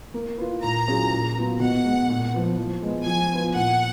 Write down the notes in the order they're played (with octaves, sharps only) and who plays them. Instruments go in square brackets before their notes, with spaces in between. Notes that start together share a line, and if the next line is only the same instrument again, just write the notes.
[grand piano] A#3
F4 B4
[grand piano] A#2 [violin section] A#5
[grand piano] F#3 C#4 F4 G#4
A#2
F#3 B3 F4
[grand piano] B2 [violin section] F#5
[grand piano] G#3 B3
A#2
F3 B3
F3
G#3 B3
[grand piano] F3 [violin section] G#5
[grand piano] B3 F4 B4
[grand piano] A#2 [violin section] F#5